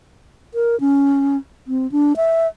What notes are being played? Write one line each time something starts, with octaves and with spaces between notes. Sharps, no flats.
A#4
C#4
C4
D4
E5